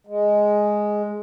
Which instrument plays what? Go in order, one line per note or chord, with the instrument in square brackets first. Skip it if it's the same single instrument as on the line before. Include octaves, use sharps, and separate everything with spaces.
[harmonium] G#3